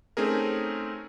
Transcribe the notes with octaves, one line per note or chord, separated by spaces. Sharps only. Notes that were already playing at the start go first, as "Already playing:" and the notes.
A3 C4 C#4 D#4 G#4 A#4